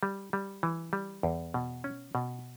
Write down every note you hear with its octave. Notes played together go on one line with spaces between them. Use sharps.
G3
G3
E3
G3
E2
B2
C#4
B2